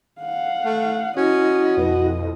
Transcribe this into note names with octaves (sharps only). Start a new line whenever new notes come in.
F5 F#5
A3
C#4 E4 F#4 D#5
F2 B2